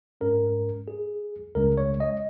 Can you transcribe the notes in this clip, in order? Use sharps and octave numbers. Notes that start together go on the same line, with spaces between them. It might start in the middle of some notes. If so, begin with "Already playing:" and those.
G#2 G#3 C#4 A#4
G#4
C#2 C#3 G#3 C#4 A#4
C#5
D#5